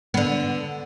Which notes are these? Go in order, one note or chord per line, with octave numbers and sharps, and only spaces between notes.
D3 B3